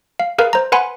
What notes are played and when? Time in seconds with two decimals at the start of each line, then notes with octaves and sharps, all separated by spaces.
0.20 F5
0.38 G#4 A#4 B4 F5
0.53 C5 A#5
0.72 B4 F#5 G#5 B5 C6